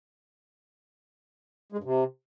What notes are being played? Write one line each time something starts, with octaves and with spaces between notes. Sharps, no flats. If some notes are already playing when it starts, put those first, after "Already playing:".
G#3
G2
C3